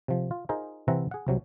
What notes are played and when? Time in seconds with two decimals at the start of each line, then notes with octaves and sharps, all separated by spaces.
0.08 C3 F3
0.31 F4
0.49 D#4 F4 G#4 A#4 C5
0.88 C3 E3 C4 E5 F#5 A#5
1.11 G#4 F#5
1.27 C2 C3 F#3